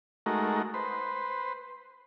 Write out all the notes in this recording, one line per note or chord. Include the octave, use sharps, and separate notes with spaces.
G#3 A3 D#4 F#4 A#4
B4 C5